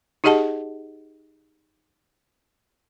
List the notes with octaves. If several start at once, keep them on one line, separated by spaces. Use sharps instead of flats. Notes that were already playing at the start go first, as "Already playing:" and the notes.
D#4 G4 G#4 D#5 F#5 A5